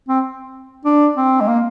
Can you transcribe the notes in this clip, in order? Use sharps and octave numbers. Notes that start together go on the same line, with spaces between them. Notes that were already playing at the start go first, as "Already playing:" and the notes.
C4
D4
C4
G#3
A#3